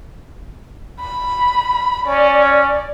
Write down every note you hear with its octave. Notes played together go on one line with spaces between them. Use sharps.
B5
C#4 D5